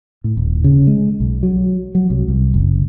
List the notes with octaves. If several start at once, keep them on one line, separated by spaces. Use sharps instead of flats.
A2
D#1
C#3
G#3
B1
F#3
F#3
C2
C2
F#1